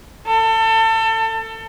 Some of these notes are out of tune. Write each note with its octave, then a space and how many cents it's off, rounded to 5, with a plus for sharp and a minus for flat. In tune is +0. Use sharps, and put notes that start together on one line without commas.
A4 +25